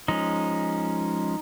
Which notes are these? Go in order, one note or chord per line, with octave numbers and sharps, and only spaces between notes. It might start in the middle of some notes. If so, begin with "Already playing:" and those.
F3 G#3 C#4 D#4